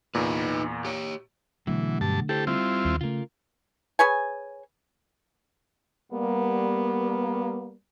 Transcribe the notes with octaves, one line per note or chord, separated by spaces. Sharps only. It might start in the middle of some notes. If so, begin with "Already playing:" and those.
E2 A#2 D#4 B4
G4 C#5
B2 D3 E3 F#3 A3
G2 A5
E4 G4 A4 C5
G3 C4 E4 F4
D#2
C#3 A3 F4 A#4
G#4 B4 C#5 G#5
G3 A#3 B3